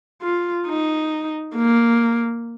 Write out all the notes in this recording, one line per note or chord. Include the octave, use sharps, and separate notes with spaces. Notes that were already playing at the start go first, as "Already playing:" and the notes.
F4
D#4
A#3